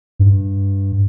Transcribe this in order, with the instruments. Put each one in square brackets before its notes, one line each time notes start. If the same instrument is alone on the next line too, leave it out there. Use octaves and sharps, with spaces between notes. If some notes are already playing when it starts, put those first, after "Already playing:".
[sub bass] G2